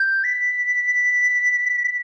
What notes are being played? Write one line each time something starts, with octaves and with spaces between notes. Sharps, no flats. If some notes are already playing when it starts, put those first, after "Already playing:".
Already playing: G6
B6